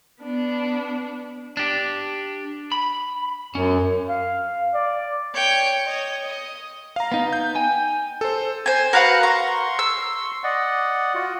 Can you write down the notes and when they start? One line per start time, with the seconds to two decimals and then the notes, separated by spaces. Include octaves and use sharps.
0.20 B3 D4
1.57 D4 G4
2.72 B5
3.55 F#2 C#4
4.09 F5
4.74 D5
5.33 C#5 G5
5.85 C#5 D#5
6.24 D#5
6.96 F5 A#5
7.12 B3 D#4
7.33 G6
7.55 G5 G#5
8.21 A4 C5
8.66 C5 G#5
8.93 F#4 A#4 B4 F5 F#5
9.23 A#5 C6 C#6
9.79 E6
10.44 D5 D#5 F#5
11.15 F4 F#4